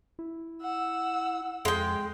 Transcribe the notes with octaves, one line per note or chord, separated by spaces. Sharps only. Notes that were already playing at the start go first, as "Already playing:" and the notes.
E4
F#5 E6
F2 G#3 G5